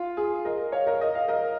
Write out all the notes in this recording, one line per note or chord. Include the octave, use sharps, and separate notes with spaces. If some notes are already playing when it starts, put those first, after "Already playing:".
Already playing: F4
G#4
A#4 D#5
C#5 F5
A#4 D#5
D#5
F5
A#4 D#5